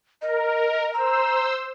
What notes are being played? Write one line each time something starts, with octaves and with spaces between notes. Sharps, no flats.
A#4 D#5
C5 A#5 E6